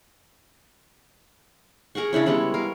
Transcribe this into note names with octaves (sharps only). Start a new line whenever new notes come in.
G#4 A#4 F#5 C#6
C#3 D4 E4 C#5
G3 G#3 B3 C#5
A#4 F5